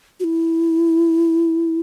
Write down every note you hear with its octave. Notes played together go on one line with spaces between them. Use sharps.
F#4
E4